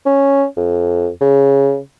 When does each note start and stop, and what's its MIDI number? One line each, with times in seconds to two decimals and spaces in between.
0.06 0.45 61
0.57 1.09 41
1.21 1.78 49